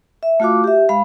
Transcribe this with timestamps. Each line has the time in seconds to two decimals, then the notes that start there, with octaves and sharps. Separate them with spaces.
0.23 E5
0.40 A3 F4 F#4 F5 D6
0.64 G4 E5
0.89 G#3 F5 B5